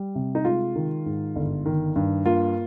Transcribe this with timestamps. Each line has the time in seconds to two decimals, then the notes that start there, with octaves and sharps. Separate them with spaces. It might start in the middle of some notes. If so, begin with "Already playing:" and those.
Already playing: G3
0.15 C3
0.35 D#4
0.45 G#3 F4
0.76 D#3
1.06 G#2
1.36 G1
1.66 D#3
1.96 G2
2.25 A#3 F4